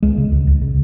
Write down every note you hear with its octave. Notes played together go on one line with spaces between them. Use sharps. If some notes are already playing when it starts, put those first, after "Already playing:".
C#2 G#3
C#3
C#2
C#2
C#3